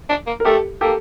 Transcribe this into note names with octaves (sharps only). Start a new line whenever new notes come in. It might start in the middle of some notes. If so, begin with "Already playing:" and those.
D4
A#3
A#4
A3 G4 A4
A#3 G4 A4